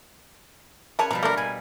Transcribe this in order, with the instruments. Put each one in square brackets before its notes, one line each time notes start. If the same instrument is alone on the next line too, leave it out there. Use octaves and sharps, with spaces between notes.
[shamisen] C#3 A#4 A5 [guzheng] B4 C#5 G#5
[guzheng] B2 F3 G3 [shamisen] A#5
[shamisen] A3 D4 [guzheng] A#3 [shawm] A#4
[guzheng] B2 [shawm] G#5